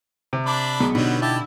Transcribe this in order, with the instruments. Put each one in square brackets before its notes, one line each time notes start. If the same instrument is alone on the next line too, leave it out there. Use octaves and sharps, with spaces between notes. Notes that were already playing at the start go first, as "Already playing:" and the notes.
[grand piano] C3
[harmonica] D4 D5 B5
[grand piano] B1 G#3 A#5 [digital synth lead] B3
[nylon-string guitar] B2 D#4 [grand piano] D3 [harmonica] F#3 G3
[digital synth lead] E4 [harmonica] G4 A5